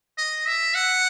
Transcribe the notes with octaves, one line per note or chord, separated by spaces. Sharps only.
D#5
E5
F#5